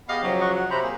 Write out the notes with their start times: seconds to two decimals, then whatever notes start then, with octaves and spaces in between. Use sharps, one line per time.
0.09 B3 G4 G#4 D#5 F5
0.22 C#3 F3 F#3
0.41 D#5 F#5 C#6
0.56 F#5
0.70 C3 C5 A#5 B5
0.83 A#3 G#4